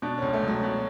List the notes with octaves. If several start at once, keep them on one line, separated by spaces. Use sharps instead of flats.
B2 D4
C#2 C#4
A3
C#2 F#3
B2